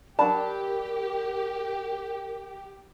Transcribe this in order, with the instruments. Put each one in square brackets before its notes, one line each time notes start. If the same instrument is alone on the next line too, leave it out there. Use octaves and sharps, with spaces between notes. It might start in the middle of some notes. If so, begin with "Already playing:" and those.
[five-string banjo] F#3 D4 A5 [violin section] G4 [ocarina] A#4 [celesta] D5 B5